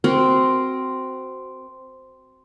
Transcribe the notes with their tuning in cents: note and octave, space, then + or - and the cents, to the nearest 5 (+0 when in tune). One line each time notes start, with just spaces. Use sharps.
C4 -5 F#4 +15 A#4 +0